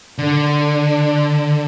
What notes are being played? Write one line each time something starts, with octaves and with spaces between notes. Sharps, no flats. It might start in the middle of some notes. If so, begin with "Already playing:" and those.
D3